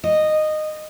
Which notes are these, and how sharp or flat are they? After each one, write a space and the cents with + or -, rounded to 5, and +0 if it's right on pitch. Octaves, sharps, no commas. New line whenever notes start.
D#5 -15